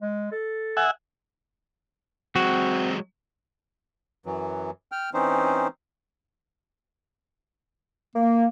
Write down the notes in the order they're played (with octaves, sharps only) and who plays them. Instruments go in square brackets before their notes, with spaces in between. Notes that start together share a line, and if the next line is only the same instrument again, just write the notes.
[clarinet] G#3
A4
[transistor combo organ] E5 F#5 G#5
[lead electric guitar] F#3 G#3 [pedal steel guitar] C4 [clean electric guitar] F#4
[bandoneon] F#2 E3 F#3
G5 F6
E3 C4 C#4 D#4 C5
[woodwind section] A#3